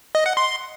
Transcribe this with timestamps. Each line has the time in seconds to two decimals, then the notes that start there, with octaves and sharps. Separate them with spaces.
0.15 D#5
0.26 F#5
0.37 C6